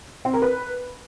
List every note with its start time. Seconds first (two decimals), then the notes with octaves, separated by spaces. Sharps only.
0.25 C4
0.33 A#4
0.42 B4